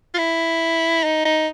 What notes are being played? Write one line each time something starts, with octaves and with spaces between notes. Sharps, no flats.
F4
E4
D#4
D#4